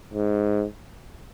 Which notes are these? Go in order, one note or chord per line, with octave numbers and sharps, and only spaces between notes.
G#2